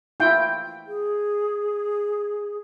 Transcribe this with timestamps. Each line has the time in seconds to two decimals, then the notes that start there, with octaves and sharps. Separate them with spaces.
0.20 E4 F4 G5
0.87 G#4